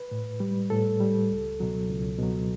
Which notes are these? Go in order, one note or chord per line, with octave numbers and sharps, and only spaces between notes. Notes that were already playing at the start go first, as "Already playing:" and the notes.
Already playing: B4
A2
G3
A2 A4
G3
C#2
B2 F#3
C#2
B2 F#3